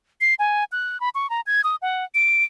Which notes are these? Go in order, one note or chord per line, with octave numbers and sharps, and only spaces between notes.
C7
G#5
F#6
B5
C#6
A#5
G#6
D#6
F#5
D7